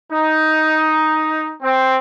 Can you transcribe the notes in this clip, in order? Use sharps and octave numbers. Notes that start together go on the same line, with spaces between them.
D#4
C4